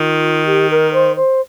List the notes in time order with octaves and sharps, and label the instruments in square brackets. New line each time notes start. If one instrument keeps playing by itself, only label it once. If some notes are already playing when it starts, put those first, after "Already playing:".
Already playing: [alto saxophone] D#3 [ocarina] F4
[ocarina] G4
A#4
C5
C5